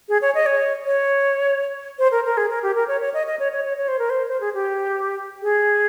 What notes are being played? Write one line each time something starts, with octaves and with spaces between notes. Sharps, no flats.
G#4
C#5
D#5
C#5
C#5
C5
A#4
A#4
G#4
A#4
G4
A#4
C#5
C#5
D#5
D#5
C#5
C#5
C#5
C#5
C5
A#4
C5
C5
G#4
G4
G#4